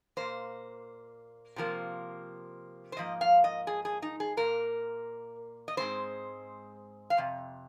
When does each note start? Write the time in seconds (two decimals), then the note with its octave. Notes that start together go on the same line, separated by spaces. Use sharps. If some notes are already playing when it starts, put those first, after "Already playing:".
0.17 A#2 A#3 C5
1.56 C3 F3 A#3
2.92 C5
2.97 G#2 F3 A#3 D#5
3.21 F5
3.44 D#5
3.67 G#4
3.85 G#4
4.02 D#4
4.20 G#4
4.37 A#2 A#3 A#4
5.68 D#5
5.77 G#2 G#3 C4 C5
7.10 F5
7.17 F2 C3